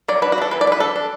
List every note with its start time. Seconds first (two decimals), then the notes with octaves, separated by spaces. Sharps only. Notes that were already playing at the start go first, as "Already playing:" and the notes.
0.08 F#3 D5
0.22 D4 B4
0.32 F#4
0.38 D4 A4
0.51 E3 B4
0.61 D5
0.67 D4
0.72 B4
0.80 D4 A4
0.96 D4